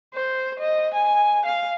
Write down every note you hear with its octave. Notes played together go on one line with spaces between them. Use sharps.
C5
D#5
G#5
F5